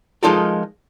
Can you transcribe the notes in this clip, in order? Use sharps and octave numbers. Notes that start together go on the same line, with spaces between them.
F3 G#3 D#4 F4 A4 A#4